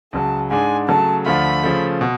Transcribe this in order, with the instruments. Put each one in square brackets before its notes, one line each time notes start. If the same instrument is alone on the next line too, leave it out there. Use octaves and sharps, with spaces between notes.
[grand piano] C#2 C#3 F#3 [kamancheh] A5
[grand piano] G#2 G#3 D4 [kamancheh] G#5
[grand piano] C#3 F#3 A3 [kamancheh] A5
[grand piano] D2 D3 F3 A3 F4 [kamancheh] B5
[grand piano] C#3 F3 A3
B2